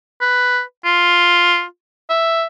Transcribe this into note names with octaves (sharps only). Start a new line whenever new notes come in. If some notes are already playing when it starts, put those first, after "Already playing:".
B4
F4
E5